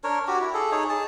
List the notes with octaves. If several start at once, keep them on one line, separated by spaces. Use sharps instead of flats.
D4 A#4 C#5
F#4 G4
E4
G#4 A4
D#4 G#4 C#5
G#4 A5